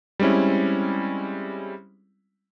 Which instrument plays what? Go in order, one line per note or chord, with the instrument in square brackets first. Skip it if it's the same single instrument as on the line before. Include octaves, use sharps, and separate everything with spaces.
[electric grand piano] G3 G#3 C4 C#4 E4